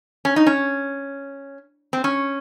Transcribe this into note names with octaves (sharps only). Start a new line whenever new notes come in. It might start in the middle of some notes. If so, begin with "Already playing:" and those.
C#4
D#4
C#4
C4
C#4